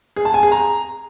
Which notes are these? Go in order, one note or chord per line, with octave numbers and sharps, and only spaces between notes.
G#4
A5
G#5
G#4
A#5